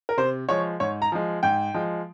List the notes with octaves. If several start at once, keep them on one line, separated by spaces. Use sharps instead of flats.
A#4
C3 C5
F3 G#3 C#5
G#2 C#5
A#5
F3 G#3
G#2 G5
F3 G#3